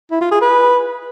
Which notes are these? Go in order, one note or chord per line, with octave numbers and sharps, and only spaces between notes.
E4
F4
G#4
B4